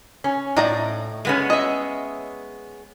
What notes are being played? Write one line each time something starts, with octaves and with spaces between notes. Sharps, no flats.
C#4
A2 D#4 D5 A#5
G#3 B3 C#4
D#5 E5